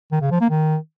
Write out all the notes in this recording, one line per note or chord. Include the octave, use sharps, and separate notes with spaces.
D#3
C#3
F3
A#3
D#3